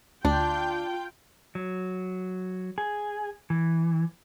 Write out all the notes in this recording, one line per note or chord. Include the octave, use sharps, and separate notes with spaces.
D2 D4 F4 G5
F#3
G#4
E3